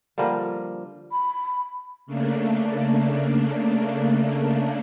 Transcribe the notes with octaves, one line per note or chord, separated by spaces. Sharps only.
D3 F3 G3 A#3
B5
C#3 A3 A#3 D4